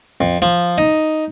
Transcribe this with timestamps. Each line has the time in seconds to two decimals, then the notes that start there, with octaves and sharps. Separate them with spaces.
0.21 F2
0.42 F3
0.78 D#4